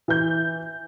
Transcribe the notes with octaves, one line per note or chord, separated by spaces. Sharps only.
E3 G6